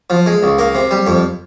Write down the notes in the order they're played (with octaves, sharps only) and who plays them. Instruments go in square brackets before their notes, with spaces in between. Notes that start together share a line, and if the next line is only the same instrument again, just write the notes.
[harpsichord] F3
G#3
C#2
A#3
C3
G3
F2